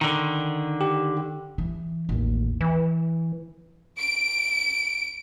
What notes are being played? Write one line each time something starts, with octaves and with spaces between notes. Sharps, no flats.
D3 D#3
G4
E3
A1 D#2
E3
D7